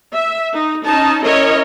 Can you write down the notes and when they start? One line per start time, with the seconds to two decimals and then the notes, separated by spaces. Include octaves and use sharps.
0.14 E5
0.54 D#4
0.85 C#4 D#4 A5
1.25 C#4 E4 A#4 C#5 D#5